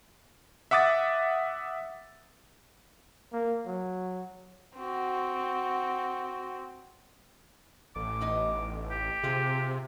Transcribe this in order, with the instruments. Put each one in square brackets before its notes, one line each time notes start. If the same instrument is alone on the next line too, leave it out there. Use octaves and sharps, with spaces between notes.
[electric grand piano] E5 F#5 D6 D#6 A6
[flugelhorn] A#3
F#3
[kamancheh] C4 F#4
[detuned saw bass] A1 [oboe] D6
[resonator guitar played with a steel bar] B3 D#4 D#5
[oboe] G4
[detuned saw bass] C3 [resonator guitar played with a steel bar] C4 F4 G#4